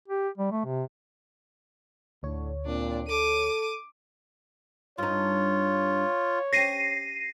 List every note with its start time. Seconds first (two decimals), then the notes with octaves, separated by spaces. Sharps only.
0.08 G4
0.37 G3
0.52 A3
0.65 C3
2.23 D2 A2 D3 C#5
2.66 A#2 C4 D4
3.08 A4 D6 D#7
4.98 G2 D#4 F4 C#5
6.53 C#4 G4 A#6 C7 D#7